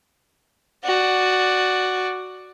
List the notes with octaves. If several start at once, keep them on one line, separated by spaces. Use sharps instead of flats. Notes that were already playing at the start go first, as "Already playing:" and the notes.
F#4 D5